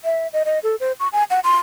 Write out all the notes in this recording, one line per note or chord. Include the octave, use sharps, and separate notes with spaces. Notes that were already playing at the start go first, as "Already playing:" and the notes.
E5
D#5
D#5
A4
C5
C#6
G#5
F#5
C6